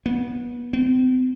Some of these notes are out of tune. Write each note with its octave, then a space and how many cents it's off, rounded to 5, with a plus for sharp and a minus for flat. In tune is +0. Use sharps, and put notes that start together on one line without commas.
B3 -25
C4 -40